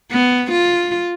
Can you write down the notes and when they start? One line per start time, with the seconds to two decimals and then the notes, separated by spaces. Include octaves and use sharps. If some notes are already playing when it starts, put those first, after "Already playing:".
0.12 B3
0.51 F4